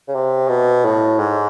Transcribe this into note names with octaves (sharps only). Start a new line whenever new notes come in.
C#3
C3
B2
A2
G#2